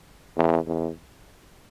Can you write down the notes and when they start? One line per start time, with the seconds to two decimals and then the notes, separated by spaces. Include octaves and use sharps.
0.37 E2
0.67 E2